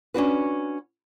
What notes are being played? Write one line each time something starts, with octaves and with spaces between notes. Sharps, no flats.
C#4 D4 F#4 B4